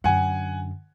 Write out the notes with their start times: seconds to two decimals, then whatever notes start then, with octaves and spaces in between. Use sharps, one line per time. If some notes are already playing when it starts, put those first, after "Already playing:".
0.04 F#2 D3 F#5 G#5